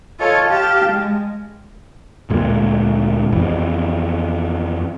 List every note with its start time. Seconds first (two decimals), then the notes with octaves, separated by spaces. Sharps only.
0.19 F4 A4 C#5 D#5 F5
0.49 G4 F5 G5 A5
0.85 G#3
2.30 D2 A#2 G#3
3.32 F2 E3